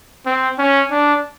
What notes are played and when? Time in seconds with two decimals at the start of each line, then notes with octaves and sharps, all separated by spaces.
0.26 C4
0.58 C#4
0.91 D4